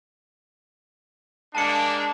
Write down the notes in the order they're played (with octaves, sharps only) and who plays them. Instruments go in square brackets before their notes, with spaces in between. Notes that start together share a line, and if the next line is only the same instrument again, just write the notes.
[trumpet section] G#3 A#3 D4 [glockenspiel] A5 C#7